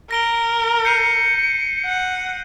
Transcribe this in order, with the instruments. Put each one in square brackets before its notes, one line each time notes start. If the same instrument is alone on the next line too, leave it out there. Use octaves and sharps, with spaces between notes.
[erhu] A#4 [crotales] A#6 D7 G7
[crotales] G6 C7 D#7 [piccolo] C#7
[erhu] F#5